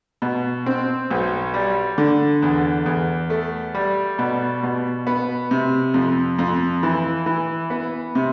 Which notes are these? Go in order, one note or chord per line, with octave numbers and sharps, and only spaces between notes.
B2
C4
B1
G3
D3
E2
E2
A3
G3
B2
B2
B3
C3
F2
F2
E3
E3
B3
C3